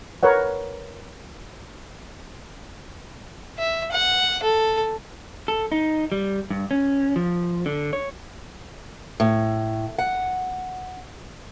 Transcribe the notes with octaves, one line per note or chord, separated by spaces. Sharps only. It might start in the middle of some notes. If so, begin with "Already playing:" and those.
A#4 B4 C#5 F#5
E5
F#5
A4
A4
D#4
G3
G2
C#4
F3
D3
C#5
A2
F#5